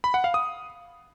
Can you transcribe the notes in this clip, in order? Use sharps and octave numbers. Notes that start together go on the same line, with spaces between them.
B5
F#5
F5
D#6